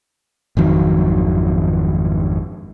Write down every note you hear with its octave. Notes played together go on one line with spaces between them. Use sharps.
G#1 F2 D#3 F#3